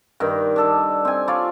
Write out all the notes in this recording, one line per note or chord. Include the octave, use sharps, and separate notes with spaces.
G2 D#3
D4 A4 A5
C4 G#5
F4 C#5 D5